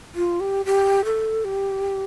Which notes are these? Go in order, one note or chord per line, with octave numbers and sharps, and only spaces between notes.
F4
G4
G4
A4
G4